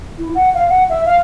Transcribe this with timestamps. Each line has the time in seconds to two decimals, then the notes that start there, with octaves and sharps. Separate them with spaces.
0.18 E4
0.35 F#5
0.54 F5
0.69 F#5
0.89 E5
1.05 F5